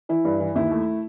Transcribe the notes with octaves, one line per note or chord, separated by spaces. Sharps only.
E3 E4
G2
E3
D#2 E4
A3